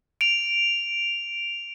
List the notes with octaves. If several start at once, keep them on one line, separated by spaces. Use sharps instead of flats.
D7 F7